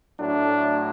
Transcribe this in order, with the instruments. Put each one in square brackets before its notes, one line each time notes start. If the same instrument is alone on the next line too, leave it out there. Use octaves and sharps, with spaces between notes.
[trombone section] A2 F#3 A3 D4